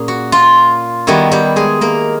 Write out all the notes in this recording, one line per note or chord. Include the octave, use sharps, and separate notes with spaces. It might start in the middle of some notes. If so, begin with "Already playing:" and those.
Already playing: A#2 A#3 C#4 G#4
F#4
F4
D#3 G3 B3 E4 F#4
G3 G4
G#3 G#4
A#3 A#4